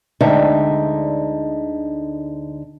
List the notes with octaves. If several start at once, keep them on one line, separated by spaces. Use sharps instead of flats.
D2 D3 G#3 D#4 E5 G5